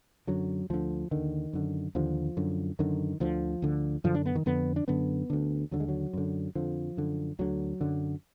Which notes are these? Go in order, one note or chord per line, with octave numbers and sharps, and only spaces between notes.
F#2 D3 F#3
D2 D3 F3
D#2 D3 D#3
F#2 D3
D#2 D3 F3
F#2 D3
F#2 D3 D#3
D2 D3 F3
D2 D3
F#2 D3 F3
D4
B3
D#3
F2 D3 B3
D4
F#2 D3 B3
D2 D3
D#2 D3 F#3
G#3
F#3
F#2 D3
F2 D3 F3
F#2 D3
D2 D3 F#3
F#2 D3